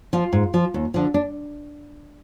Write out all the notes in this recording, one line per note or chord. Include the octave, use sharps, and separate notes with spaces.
F3 F4
G#2
F3
D#2
D3 F3
D4